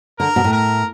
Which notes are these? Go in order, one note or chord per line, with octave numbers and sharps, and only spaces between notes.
D3 A#4
B2
A2
A#4